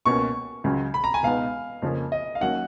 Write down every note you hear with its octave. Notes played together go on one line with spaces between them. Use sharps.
C#2 B2 A#3 C#4 C#6
C#2 C#3 F#3 C#4
B5
A#5
G#5
C#2 B2 G#3 B3 D#4 F5
F2 C#3 F3 A#3 C#4
D#5
F5
D#2 D#3 F#3 C#4 F#5